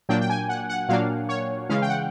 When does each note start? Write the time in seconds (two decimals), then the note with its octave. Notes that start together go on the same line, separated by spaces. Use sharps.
0.09 A#2 F#3 A#3 D4 G5
0.21 G5
0.30 G#5
0.49 F#5
0.69 F#5
0.89 A#2 F#3 A#3 D4 F5
1.29 C#5
1.69 C#3 E3 G#3 C#4 F5
1.82 G5
1.89 F#5